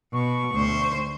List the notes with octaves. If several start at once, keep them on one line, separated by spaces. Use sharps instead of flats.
B2 C#6
D2 C5